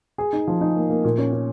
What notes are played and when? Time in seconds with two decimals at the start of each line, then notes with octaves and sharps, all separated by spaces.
0.18 G#4
0.33 D#4
0.47 F3
0.61 D#4
0.76 A#3
0.90 A#3
1.04 A#2
1.18 C#4
1.32 C#4